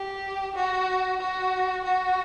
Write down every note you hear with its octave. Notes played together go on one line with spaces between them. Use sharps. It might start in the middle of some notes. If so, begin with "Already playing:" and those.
Already playing: G4
F#4
F#4
F#4